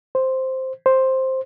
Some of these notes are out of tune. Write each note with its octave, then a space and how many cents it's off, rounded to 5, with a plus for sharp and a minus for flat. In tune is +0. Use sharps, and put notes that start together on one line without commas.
C5 +0
C5 +5